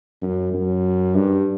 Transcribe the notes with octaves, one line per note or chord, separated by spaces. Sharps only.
F#2
F#2
G2